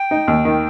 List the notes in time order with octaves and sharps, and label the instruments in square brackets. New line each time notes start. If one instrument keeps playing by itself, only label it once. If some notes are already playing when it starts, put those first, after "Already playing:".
Already playing: [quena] G5
[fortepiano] D#4
D#2
D#3